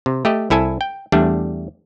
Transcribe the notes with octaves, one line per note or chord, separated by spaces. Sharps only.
C3
A3 G4 D#5
C2 E4 A4 G#5
G5
E2 G3 A3 D4